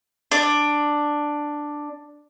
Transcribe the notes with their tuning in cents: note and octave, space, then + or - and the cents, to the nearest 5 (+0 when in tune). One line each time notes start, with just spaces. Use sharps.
D4 +5